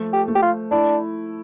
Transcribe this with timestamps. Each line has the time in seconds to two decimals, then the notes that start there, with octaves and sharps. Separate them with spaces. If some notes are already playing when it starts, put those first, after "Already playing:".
Already playing: F3 A3
0.13 G4
0.28 A3
0.35 G4
0.42 F4
0.71 D4 E4